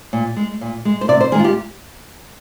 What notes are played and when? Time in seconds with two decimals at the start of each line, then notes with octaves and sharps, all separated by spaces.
0.13 A#2
0.36 G#3
0.61 A#2
0.85 G#3
1.01 C5
1.08 C3 D5
1.21 C5
1.32 D#3 G#3 G#4
1.39 F4
1.44 G4